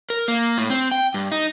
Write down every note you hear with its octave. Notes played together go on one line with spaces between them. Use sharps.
A#4
A#3
A2
C4
G5
G2
D#4